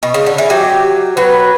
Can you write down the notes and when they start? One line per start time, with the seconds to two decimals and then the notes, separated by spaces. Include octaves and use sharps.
0.03 B2
0.14 C#3
0.26 D3
0.38 E3
0.50 F#3 G4
1.17 F#3 B4